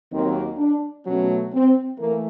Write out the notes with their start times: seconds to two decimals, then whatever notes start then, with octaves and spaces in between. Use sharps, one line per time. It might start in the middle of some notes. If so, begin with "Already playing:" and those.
0.11 D#2 D#3 F#3 A#3 C4
0.57 D4
1.04 B2 F#3 A3 C#4
1.52 C4
1.98 E3 A3 A#3